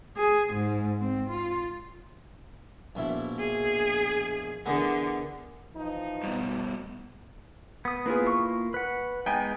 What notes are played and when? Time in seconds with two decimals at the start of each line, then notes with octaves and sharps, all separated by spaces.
0.17 G#4
0.53 G#2
1.00 C4
1.30 F4
2.95 A#1 B2 E4
3.39 G#4
4.66 D3 E3 B3 G#4 A#4
5.76 E3 F3 D#4
6.23 G2 B2
7.85 B3 D#6
8.06 A#3 B3 E4 F4 G#4
8.27 C#6
8.74 B4 F#5
9.26 G#3 B3 D#4 G5 G#5